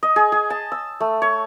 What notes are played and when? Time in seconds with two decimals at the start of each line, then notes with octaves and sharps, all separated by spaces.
0.03 D#5
0.16 G#4
0.32 G#4
0.50 A5
0.72 E6
1.00 A3
1.22 C#5